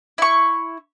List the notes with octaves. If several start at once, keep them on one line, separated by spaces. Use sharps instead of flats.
E4 C#6